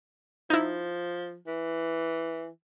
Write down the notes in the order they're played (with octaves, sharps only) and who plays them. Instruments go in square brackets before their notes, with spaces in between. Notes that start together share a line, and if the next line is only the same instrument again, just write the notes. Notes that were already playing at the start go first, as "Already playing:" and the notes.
[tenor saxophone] F3 [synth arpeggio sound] D#4 E4
[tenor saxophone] E3